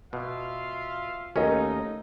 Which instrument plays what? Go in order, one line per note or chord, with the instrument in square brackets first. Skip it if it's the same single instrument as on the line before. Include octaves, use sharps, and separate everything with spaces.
[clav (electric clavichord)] B2 [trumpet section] F4 E5 F5
[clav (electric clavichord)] D#2 C#4 [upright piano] A3 A#4 D#5 [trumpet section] D#4